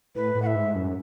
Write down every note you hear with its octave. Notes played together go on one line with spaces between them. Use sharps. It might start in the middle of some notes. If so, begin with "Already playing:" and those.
A2 B4
A2
F#5
E5
G#2
F#2